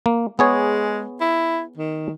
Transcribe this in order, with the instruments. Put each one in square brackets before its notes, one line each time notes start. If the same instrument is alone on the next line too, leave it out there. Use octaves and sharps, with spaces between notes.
[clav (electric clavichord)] A#3
[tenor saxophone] G#3 [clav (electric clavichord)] B3 G#4 C#5
[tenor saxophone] E4
D#3